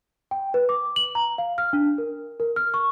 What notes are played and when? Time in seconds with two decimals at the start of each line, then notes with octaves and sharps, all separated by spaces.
0.31 G5
0.54 B4
0.69 D6
0.96 F#7
1.15 A#5
1.38 F5
1.58 F6
1.73 D4
1.98 A#4
2.40 A#4
2.56 F6
2.74 C#6